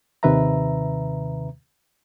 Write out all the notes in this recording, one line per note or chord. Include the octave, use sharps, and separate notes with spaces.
D#2 C3 D#3 B4 E5 A#5